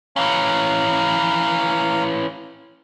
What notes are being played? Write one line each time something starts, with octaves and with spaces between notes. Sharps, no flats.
E3 C#4 F5 A#5